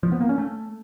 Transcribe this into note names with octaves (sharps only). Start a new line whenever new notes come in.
F3
B3
A#3
C#4
A3